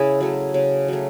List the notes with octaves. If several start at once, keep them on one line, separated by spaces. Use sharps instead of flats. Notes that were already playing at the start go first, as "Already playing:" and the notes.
Already playing: C#3 E4 G#4
F#3 A3
C#3
F#3 A3